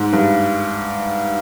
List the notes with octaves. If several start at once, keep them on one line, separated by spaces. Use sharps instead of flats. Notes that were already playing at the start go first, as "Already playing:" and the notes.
Already playing: G#2
G2